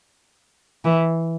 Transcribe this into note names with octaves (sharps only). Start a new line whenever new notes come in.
E3